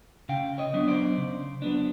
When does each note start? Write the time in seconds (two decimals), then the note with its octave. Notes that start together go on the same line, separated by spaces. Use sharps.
0.29 C#3 F5 G5
0.58 C#5 D#5
0.74 F#3 B3 D4
0.88 C5 D5
1.17 C#3
1.62 F#3 B3 D4